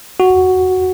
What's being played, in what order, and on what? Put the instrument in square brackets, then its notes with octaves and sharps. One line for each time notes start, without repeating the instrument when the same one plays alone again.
[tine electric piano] F#4